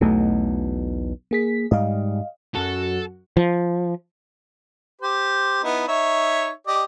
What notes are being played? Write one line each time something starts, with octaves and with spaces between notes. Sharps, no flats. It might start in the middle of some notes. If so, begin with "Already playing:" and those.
B1 E2 B2 A3
A#3 G#4 B6
G#2 G3 D#5 F5
F#2 F#4 A4
F3
G4 C5
B3 D#4 E4
D#4 C#5 E5
G4 D5 D#5